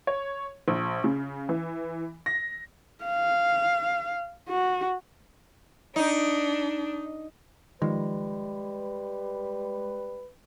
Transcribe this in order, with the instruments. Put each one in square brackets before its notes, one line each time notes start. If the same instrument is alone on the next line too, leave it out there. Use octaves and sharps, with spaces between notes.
[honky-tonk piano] C#5
A#1
C#3
E3
A#6
[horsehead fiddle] F5
F#4
[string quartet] D4 [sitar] D#4
[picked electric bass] D#3 F3 [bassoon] G3 [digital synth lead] G#3 [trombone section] B4